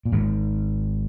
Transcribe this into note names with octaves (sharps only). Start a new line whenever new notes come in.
A#2
G#1 G#2